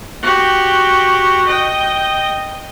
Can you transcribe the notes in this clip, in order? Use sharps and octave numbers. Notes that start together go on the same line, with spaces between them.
F#4 G4
D#5 G5